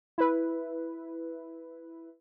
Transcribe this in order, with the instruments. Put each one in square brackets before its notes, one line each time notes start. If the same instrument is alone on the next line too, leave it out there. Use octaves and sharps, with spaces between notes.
[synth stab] E4 B4